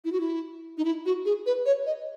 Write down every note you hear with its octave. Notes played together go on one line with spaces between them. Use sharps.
E4
F#4
E4
D#4
E4
F#4
G#4
B4
C#5
D#5